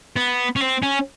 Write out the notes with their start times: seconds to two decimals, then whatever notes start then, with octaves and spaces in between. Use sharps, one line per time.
0.17 B3
0.56 C#4
0.61 C4
0.83 C#4